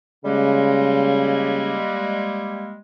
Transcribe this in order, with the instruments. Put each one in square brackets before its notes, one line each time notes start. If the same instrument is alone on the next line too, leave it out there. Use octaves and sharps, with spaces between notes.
[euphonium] C#3 [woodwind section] G3 G#3 A#3